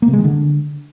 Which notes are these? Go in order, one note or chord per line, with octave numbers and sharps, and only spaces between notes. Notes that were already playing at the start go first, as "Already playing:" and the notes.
A#3
C3
G#3
D#3
D3